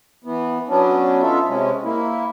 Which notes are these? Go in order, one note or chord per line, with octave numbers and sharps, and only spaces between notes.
E3 B3
F#3 B3 C#4 D4
D#4 F4 A4 E5
C3 G#3 C#4
A#3 E4